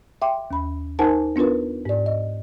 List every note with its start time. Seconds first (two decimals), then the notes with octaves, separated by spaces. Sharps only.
0.22 E5 G5 C6 D6
0.51 D#2 B5
0.99 D#4 A#4 C5 F#5 G#5 A5
1.36 B3 D4 F4 A#4 B4
1.85 G#2 D5
2.06 D#5